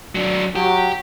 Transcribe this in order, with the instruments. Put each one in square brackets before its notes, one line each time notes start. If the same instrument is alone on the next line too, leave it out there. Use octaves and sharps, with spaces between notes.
[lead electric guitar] F#3 D4
[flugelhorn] F#3 [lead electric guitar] G4